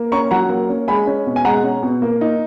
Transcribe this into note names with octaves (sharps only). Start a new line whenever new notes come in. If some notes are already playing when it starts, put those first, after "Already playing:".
Already playing: A#3
C#4 A#5 C#6
F#3 F#5 A#5
A#3
C#4
G#3 G#5 B5
C#4
B2
G#5
G#3 F#5 A#5
C#4
B2
A#3
D#4